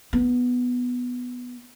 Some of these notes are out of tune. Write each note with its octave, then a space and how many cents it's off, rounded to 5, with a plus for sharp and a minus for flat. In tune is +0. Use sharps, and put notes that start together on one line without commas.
B3 +0 D#4 -30